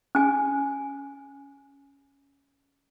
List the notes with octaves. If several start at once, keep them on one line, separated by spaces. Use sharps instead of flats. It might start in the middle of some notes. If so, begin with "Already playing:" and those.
C#4 G#5